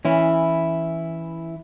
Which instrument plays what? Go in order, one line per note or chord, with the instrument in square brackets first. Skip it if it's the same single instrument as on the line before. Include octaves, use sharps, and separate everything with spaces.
[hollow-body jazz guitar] E3 C#4 E4